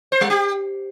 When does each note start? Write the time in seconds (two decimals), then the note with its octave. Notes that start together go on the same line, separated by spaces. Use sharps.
0.12 C5
0.21 G3
0.30 G4